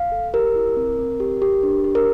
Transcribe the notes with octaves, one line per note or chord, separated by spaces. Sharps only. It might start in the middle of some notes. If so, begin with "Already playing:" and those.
Already playing: F5
A4
G4 A#4
E4
C4
C4
G4
G4
D4
G4
A#4